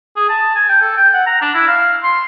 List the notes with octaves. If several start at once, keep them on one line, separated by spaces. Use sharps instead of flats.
G#4
A5
G#5
G5
A4
G5
F#5
A#5
D4
E4
F5
C6